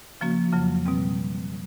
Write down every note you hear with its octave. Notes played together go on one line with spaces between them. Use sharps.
C#3 F3 A#3 C#4 F#4
F2 C#3 F#3
B2 G3 C4